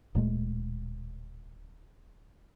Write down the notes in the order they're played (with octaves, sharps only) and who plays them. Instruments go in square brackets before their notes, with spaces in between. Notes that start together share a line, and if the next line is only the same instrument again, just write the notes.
[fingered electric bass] D1 A#2 G#3 A3